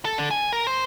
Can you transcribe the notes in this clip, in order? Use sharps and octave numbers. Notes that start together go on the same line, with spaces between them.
A4
D3
G#5
A#4
C5